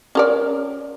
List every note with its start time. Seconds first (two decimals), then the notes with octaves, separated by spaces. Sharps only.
0.15 C#4 A#4 D5